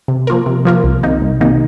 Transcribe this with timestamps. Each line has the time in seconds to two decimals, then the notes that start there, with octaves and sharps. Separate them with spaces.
0.08 C3
0.27 F3 A#3 F4 A#4
0.46 C3
0.65 F3 A#3 F4 A#4
0.84 C2
1.03 C3 D#3 A#3 D#4
1.22 C2
1.41 C3 D#3 A#3 D#4